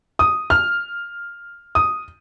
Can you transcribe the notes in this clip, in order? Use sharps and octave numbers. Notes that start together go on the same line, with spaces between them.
D#6
F6
D#6